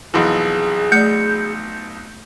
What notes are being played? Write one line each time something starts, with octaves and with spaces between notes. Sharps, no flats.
B1 F2 E3 G#4
A3 D5 G6 C#7